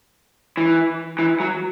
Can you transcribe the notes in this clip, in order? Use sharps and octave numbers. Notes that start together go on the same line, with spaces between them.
E3
E3
F#3